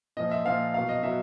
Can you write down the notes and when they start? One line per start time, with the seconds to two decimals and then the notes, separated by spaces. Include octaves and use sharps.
0.17 A#2 F3 D#5
0.31 E5
0.45 A#2 F3 F5
0.74 B2 F#3 F5
0.89 D#5
1.03 B2 F#3 E5